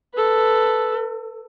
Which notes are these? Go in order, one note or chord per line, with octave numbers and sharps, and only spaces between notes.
A4 B4